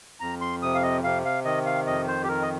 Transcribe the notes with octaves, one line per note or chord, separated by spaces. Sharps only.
F2 A#5
C6
C3 D#6
F5
D#5
C3 F5
F5
D#3 D#5
F5
F2 D#5
C5
G4
D#3 A#4
D#5